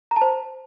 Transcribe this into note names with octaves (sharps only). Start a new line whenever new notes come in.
A#5
A5
C5